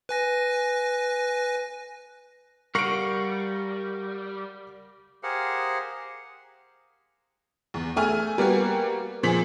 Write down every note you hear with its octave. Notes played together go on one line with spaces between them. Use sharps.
B4 G#5 A#6
G3 A#4 F5 F#5 C#6 D7
G4 G#4 A#4 C5 F5 F#5
E2
A3 G#4 G#5 F6
G3 A#3 B3 F#4
A#2 F3 G#4 B6 F#7